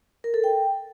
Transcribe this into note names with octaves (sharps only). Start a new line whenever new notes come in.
A#4
A4
G5